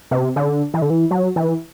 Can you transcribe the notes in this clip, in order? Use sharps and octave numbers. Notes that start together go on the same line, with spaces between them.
C3
D3
E3
D3
E3
F#3
E3